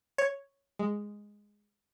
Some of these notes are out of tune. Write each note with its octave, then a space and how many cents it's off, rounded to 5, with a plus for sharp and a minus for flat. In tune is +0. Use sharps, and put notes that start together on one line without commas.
C#5 +0
G#3 -5